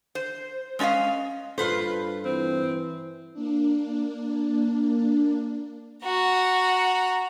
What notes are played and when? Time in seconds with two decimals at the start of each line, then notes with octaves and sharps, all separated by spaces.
0.15 C5
0.79 G#3 C#4 D5 D#5 F5
1.58 G2 F4 A4 B4 C5
2.25 E3 C4
3.33 A#3 D4
6.04 F#4 A#5